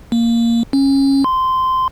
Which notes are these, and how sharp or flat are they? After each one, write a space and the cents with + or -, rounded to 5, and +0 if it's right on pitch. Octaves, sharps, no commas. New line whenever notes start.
A#3 -5
C#4 -20
C6 -15